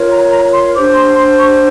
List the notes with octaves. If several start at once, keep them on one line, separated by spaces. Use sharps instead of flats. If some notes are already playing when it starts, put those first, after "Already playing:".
Already playing: F4 A#4 C#5
A#5
A#5
C6
D4 G4 C5 D6
C6
C6
C#6